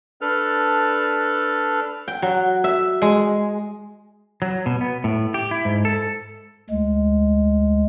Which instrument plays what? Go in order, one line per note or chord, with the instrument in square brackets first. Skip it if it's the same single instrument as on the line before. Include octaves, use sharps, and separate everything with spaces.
[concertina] D4 A4 B4 F6
[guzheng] G5
F#3
E5
G#3
[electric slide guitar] F#3
B2
B3
A2
G4
E4
G#2
A4
[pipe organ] D2 G#3